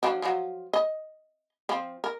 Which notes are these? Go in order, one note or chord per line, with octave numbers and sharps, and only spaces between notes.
F3 F#3 D4
F3 F#3
D#5
F3 C4
A#4